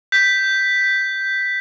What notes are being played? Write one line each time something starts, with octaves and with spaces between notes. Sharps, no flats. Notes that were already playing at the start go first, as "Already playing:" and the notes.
G6 B6